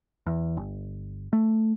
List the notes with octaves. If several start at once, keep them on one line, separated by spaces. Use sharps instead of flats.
E2
G1
A3